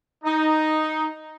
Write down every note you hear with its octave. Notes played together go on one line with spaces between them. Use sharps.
D#4